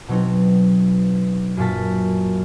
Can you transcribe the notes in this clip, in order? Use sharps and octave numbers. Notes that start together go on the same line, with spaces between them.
B2 F#3 C4 D#4
F#2 A#2 A5 B6